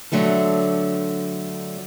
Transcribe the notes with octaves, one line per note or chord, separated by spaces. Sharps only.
D3 F#3 A3 A4